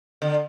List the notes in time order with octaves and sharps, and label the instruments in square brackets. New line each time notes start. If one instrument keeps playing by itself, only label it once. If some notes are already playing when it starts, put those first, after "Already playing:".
[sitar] D3